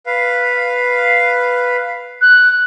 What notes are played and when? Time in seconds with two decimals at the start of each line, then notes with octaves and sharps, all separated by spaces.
0.06 B4 F5
2.21 F#6